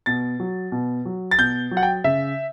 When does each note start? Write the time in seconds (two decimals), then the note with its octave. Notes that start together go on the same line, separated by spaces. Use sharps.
0.06 B2 A6
0.40 F#3
0.72 B2
1.05 F#3
1.31 A6
1.38 B2 G6
1.71 F#3
1.77 F#5
1.83 G5
2.04 C#3 E5